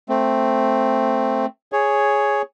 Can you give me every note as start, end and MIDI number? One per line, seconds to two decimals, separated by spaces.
0.09 1.46 57
0.09 1.46 60
1.72 2.42 68
1.72 2.42 73